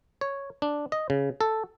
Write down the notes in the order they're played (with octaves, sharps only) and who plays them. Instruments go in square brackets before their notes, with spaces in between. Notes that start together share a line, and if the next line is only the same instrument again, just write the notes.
[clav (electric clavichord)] C#5
D4
D#5
C#3
A4